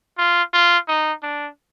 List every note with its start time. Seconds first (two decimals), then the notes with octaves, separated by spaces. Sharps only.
0.18 F4
0.53 F4
0.88 D#4
1.23 D4